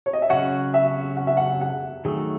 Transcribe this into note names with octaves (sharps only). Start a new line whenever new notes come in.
C#5
D#5
E5
C#3 F#3 C#4 F#4 F#5
E5
F#5
E5
F#5
F#5
D#3 F#3 A3 G#4